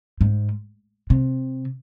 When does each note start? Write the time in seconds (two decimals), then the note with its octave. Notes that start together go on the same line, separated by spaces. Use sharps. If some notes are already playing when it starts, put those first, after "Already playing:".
0.21 G#2
1.10 C3